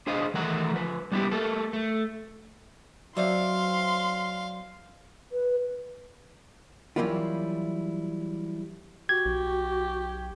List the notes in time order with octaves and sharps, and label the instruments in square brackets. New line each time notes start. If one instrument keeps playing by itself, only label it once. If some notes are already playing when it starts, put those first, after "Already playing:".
[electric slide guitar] D4 G#4 C5 D#5 F5
D#3 E3 A3 F#5 A#5
F3 B4
G3 B3 D#4 E4 G4
A3 A#3 A4
A3
[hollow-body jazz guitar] F#3 [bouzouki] C4 D5 E5 [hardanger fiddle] F5 [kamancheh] C6
[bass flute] B4
[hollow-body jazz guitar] E3 F#3 G3 A#3 E4 F4
[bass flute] F#4 [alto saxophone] G4 [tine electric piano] G#6
[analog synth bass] B1